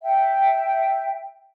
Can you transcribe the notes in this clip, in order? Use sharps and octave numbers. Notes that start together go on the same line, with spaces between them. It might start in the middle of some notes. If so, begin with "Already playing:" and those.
E5 G5